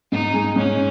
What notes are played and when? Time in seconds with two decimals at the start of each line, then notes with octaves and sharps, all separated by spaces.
0.12 G#2 D#4
0.34 G#3
0.56 G#2 C#4